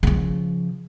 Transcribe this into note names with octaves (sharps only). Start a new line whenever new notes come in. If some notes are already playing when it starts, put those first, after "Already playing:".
C#3 F3